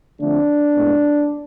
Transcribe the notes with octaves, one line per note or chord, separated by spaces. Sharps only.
D3 F3 A3 C4 D4
A2 G#3 B3